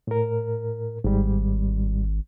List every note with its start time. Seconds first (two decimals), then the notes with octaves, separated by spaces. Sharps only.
0.07 A2 A#4
1.04 G#1 G#2 G3